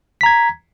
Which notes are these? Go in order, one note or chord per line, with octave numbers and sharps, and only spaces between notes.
A#5 G#6 B6